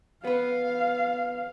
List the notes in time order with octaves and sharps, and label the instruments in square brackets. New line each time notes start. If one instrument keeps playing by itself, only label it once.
[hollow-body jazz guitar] B3 B4 [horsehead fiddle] F5